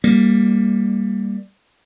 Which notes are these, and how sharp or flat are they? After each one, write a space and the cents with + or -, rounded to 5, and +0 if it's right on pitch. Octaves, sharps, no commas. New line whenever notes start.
G3 +15 A#3 +0